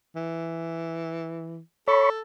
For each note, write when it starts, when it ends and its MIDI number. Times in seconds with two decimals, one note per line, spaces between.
0.16 1.59 52
1.88 2.22 69
1.88 2.10 73
1.88 2.10 83
1.88 2.10 85